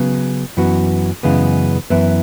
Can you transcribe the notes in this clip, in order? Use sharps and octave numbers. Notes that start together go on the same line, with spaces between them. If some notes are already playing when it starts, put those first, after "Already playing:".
Already playing: C#3 F#3 B3
F#2 E3 B3 F#4
F#2 C#3 E3 G#3 B3
F#2 E3 B3 E4